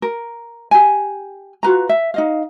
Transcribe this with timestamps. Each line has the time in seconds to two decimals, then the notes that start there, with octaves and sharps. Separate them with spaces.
0.02 A#4
0.71 G4 G#5
1.63 F4 F#4 B4 A#5
1.89 E5
2.14 D#4 D#5 F5